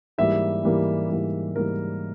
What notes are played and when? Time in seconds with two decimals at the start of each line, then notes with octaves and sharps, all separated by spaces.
0.18 G#2 E3 G3 A#3 E5
0.64 G#2 E3 G3 A#3
1.09 G#2 E3 G3 A#3
1.56 G#2 E3 G3 A#3 A#4